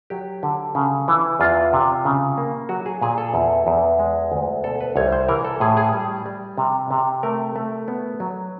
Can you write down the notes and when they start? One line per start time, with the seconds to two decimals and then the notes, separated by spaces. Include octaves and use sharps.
0.10 F#3 G4
0.43 D3
0.75 C#3
1.08 E3
1.40 E2 F4
1.73 C3
2.05 C#3
2.38 A#3
2.69 F#3 F#4
2.86 G#4
3.01 A#2 G#4
3.18 A4
3.34 E2
3.67 E2
3.99 G#3
4.32 D2
4.64 B2 A4
4.81 B4
4.96 C2 C#5
5.12 C5
5.29 E3 A#4
5.45 A4
5.60 A2 G#4
5.77 G#4
5.93 G3
6.26 G3
6.58 C3
6.91 C3
7.23 A3 A#4
7.56 A3
7.88 B3
8.20 F#3